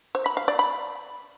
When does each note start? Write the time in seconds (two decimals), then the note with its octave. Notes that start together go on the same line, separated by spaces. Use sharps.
0.15 C5
0.26 B5
0.37 F5
0.48 D5
0.59 B5